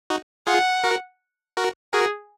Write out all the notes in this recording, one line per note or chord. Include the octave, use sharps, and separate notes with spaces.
D#4 F#4
F4 G#4 F#5
F#4 A#4
F#4 A#4
F#4 G#4 A#4